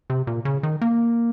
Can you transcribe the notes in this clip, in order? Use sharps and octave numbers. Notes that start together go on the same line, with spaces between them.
C3
A#2
C#3
D#3
A#3